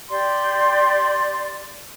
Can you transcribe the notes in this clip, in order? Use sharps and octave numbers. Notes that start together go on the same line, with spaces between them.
G4 D5 C6